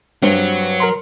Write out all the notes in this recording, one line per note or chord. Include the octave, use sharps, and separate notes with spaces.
G2 F#3 C4
A#4 A#5 C6